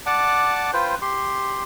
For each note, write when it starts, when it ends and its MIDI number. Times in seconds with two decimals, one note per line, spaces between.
0.06 0.71 74
0.06 0.71 78
0.06 0.71 81
0.06 0.71 86
0.73 0.95 65
0.73 0.95 71
0.73 0.95 72
0.73 0.95 79
1.02 1.63 67
1.02 1.63 84